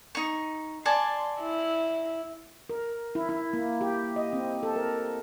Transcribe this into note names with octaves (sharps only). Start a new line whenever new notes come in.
D#4 C#6
D5 G#5 A5 C6
E4
A#4
E4
E4
A#3
G4
D#5
C4
A4
A#4